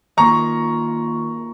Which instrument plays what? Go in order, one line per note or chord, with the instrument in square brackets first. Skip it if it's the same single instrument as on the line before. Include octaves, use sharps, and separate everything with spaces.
[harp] D#3 A#3 F4 [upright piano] A#5 C#6